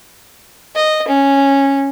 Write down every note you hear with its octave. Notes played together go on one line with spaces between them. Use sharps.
D#5
C#4